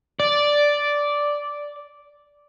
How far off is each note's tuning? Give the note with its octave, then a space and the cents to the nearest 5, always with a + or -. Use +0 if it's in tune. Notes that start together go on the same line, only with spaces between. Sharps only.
D5 -5